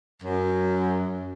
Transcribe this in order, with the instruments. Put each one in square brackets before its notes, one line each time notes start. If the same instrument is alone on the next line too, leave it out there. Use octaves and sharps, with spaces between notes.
[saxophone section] F#2